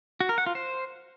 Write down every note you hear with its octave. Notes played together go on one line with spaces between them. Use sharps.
F#4
A#4
F#5
F4
C5